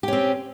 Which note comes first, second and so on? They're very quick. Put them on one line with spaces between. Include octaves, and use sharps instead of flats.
G4 C#4 C4